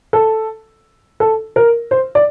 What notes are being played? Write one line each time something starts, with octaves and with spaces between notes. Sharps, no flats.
A4
A4
A#4
C5
D5